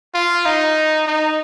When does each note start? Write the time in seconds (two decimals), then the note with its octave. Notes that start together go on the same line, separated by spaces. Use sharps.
0.15 F4
0.46 D#4
1.08 D#4